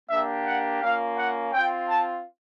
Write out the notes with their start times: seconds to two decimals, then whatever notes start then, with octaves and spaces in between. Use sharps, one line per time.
0.10 A#3 D4 G4 E5
0.46 F#5
0.81 A#3 C#4 F4 F5
1.17 F#5
1.53 C4 F4 G5
1.89 A5